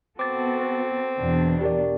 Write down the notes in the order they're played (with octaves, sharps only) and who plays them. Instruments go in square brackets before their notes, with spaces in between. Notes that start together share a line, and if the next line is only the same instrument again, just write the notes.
[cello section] B3 F#4 A4 [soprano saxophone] C4 [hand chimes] D6 A6
[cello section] E2 B2 D4
[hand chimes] G4 A#4 D5